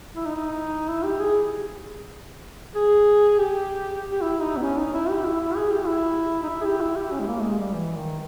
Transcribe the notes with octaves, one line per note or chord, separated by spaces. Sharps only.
E4
D#4
E4
G4
G#4
G#4
G4
G4
E4
D#4
B3
C#4
D#4
E4
G4
E4
E4
G#4
G4
E4
D#4
E4
G#4
G4
E4
G4
C#4
G#3
A#3
G#3
G3
E3
D#3